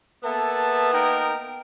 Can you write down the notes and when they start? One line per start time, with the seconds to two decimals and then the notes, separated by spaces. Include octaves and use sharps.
0.24 A#3 B3 A4 E5 A5
0.93 D#4 A#4 G5